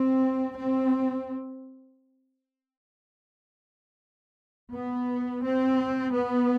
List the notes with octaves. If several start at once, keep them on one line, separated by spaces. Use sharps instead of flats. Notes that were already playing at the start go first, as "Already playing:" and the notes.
Already playing: C4
C4
B3
C4
B3